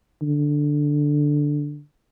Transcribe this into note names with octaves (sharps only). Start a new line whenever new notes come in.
D3